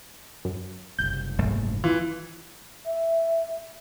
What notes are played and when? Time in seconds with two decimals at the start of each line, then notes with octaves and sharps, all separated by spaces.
0.45 F#2
0.99 F#1 C2 G6
1.38 A#1 G#2 A3
1.84 E3 F4
2.86 E5